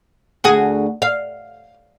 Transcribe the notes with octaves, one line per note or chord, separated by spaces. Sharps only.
D2 F#4 G#4
F5